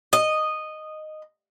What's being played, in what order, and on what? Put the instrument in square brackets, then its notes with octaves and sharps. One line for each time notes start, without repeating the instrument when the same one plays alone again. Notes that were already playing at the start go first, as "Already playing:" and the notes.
[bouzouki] D#5